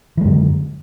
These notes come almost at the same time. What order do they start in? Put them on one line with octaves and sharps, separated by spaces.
E3 G#3 F#2 D3